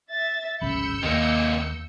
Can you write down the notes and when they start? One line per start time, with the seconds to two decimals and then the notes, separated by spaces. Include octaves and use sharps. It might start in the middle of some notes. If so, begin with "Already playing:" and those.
0.11 E5 A6
0.61 D1 G#1 C#3 B5 E6 G6 C#7
1.03 D#2 C3 A#3 D#5